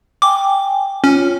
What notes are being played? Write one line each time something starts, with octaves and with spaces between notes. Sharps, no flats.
G5 G#5 D6
C#4 F4 C#5